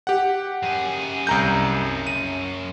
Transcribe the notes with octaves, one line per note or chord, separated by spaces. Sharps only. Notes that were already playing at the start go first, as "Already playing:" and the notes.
G4 F#5
F#2 G#4
C2 A#5 G6
D#7